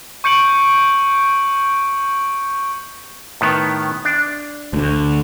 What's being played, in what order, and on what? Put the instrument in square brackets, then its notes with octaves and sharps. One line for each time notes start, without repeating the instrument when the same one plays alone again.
[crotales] C#6 G6 C#7 D7 F#7
[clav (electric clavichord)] A2 D#3 B3
D4
[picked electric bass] D2 D3